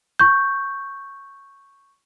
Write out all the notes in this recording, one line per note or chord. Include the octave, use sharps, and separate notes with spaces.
C#6 G6